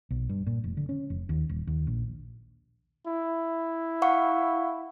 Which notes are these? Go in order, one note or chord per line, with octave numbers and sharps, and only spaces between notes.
B1
G2
A#2
F1
D3
C#4
F1
D#2
D#1
D#2
A#1
E4
F5 F#5 C#6